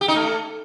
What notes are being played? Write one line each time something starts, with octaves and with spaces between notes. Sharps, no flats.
G4
D#4
A3